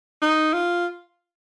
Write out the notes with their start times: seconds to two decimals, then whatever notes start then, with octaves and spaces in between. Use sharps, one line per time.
0.22 D#4
0.53 F4